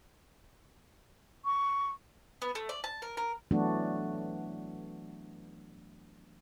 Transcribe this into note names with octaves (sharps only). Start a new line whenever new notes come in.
C#6
B3
A3
D5
A5
A#4
A#4
E3 F#3 A3 B3 D4 F#4